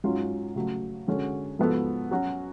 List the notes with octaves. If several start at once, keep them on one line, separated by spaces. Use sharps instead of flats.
G#2 F#3 C#4 F4
C#3 F#3 A3
D3 G#3 C#4 F#4 A4
G#2 F3 B3 F#4 A4
F#3 C#4 F#4